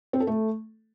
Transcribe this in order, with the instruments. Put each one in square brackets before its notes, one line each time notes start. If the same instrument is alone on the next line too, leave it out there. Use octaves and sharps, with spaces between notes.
[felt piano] C4
A4
A3